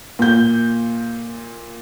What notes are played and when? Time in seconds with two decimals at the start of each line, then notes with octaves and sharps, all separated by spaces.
0.19 A#2 G6